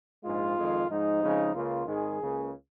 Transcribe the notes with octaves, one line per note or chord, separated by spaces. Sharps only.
A#1 G#2 G#3 F4
F2 D#3 G#3
G#2 F3 G#3 D#4
F2 C#3 F3 G#3
C#2 C#3 A#3 F4
G#1 G#2 D#3 G#3 G#4
C#2 C#3 A#3